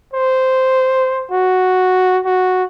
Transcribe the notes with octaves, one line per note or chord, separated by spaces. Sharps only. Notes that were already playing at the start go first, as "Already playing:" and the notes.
C5
F#4
F#4